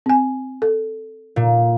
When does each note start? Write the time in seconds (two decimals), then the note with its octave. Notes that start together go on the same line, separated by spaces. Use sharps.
0.06 C4 G#5
0.62 A4
1.36 A#2